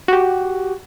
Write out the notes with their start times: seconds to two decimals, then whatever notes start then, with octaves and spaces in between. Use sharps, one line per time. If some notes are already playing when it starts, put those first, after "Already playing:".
0.08 F#4 G4